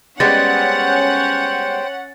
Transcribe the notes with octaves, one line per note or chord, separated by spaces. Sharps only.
G3 G#3 B3 C#4 C5 F#5 G5 A6